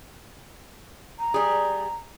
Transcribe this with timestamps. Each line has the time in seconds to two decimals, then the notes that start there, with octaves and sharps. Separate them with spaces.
1.19 A#5
1.34 G3 G#4